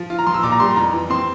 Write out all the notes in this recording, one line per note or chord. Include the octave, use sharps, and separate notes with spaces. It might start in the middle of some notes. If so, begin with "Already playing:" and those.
Already playing: F3
F4
A#5
F3 C6
E6
A#2 D6
A#5
G3 C6
F2 A#5
E3
C4 C6